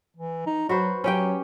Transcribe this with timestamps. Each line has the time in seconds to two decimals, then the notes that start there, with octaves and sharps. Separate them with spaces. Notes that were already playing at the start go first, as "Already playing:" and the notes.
0.17 E3
0.47 D#4
0.69 F#3 F#4 B4 C5
1.04 F#3 C#4 G4 G5